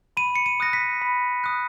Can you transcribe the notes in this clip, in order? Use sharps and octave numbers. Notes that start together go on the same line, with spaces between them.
B5 D#7
C#7
D#7
D#6 F#6 A#6
B6
B5
D#6 F#6